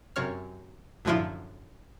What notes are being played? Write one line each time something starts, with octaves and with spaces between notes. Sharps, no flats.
F#2 C3 C#5 F6
F#2 A2 D3 F3 E4 F4